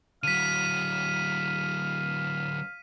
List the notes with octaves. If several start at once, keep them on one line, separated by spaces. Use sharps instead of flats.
D3 F#3 F5 B6 D#7